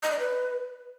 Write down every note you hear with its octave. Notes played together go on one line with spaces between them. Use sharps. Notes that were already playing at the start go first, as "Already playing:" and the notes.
D#5
D5
B4